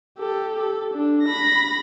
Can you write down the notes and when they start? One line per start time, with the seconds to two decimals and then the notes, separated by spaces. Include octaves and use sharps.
0.19 G4 A4
0.59 A4
0.94 D4
1.23 B5 A#6